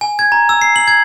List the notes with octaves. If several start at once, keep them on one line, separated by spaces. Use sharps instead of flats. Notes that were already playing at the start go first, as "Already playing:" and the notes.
G#5
G#6
A#5
E6
C7
F#7
G#6